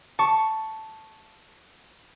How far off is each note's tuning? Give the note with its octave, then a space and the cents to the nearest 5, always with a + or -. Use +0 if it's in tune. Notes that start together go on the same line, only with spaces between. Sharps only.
A5 +0 C#6 +0